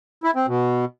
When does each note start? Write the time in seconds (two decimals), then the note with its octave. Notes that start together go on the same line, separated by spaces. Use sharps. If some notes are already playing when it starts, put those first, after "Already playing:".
0.24 E4
0.35 C4
0.47 B2